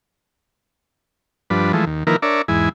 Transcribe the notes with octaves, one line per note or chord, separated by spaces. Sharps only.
G2 F3 D4 B4
E3 F3 G#3 A3
D#2
D#3 F3 A#3 E4 A#4 B4
D4 A#4 C#5 D5 E5
E2 G#2 E4 G#5